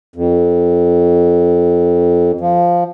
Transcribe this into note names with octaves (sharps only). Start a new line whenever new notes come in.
F2
F3